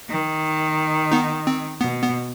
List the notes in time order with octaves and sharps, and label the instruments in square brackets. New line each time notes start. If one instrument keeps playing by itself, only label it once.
[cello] D#3
[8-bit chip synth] B3 D#4
C4
[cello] B2 [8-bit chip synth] B3
[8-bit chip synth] B3